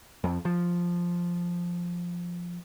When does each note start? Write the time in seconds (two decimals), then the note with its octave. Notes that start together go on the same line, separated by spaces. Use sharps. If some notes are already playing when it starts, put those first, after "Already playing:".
0.24 F2
0.45 F3